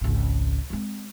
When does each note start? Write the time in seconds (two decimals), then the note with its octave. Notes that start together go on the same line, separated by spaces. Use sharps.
0.01 G#1 C#2
0.70 G#3 C4